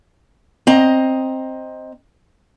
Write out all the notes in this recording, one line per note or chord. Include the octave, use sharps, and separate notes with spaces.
C4 D#5 A#5